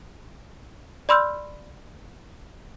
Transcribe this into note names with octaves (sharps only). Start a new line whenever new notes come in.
D5 B5 C6 E6 F6 G6